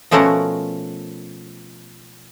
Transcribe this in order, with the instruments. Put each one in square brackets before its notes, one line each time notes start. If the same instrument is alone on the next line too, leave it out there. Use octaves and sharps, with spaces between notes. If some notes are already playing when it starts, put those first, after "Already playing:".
[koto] B2 F3 A3 C#4 A#4 F#5